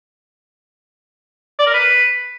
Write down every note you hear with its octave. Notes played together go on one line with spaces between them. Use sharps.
D5
A#4
B4